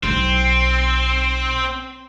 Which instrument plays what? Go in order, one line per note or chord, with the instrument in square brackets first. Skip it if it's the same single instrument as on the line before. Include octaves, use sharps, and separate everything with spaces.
[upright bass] B1 [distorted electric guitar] C4